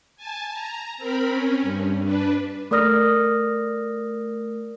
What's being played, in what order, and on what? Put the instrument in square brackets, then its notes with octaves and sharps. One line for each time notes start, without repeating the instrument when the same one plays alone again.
[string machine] G#5 A5
A#5
C4 A#4 B5
C#4
G2
D4 B4
[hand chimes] A3 A#4 D5 D#6 F6 A#6